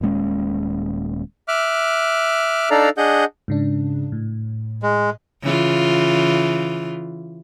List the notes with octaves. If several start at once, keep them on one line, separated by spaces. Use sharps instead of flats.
D#1 A#2 G#3 C#4
E5 D6 F6 F#6
D4 D#4 A4 D5 F5 A#5
D4 G#4 D#5 F#5 G6
G#2 C#3 D4
A2
G#3
C#3 E3 F4